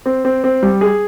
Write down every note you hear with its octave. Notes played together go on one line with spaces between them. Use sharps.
C4
C4
C4
G3
G#4